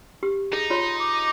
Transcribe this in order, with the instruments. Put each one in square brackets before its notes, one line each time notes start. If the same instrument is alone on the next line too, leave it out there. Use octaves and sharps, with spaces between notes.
[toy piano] G4
[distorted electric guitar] D#4 [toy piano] G#4
[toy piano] F4 C#5 [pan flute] C6
[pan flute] D6